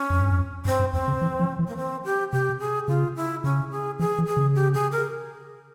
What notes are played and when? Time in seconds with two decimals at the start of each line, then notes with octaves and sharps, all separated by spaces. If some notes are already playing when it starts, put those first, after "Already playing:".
Already playing: C#4
0.10 F2
0.20 G2
0.30 F2
0.65 G2 C4
0.79 G2
0.93 E2 C4
1.08 C#3
1.21 E3
1.40 F3
1.59 E3
1.68 A#3
1.77 C4
2.05 G4
2.32 C3 G4
2.60 G#4
2.88 C#3 F4
3.16 E4
3.44 C#3 C#4
3.71 G#4
3.99 E3 G#4
4.18 E3
4.27 G#4
4.37 C#3
4.55 G4
4.74 G#4
4.92 A#4